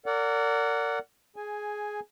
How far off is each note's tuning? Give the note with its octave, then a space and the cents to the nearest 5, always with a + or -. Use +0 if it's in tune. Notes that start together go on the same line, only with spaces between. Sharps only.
A#4 -30 D5 -25 F#5 +0
G#4 +10 G#5 +0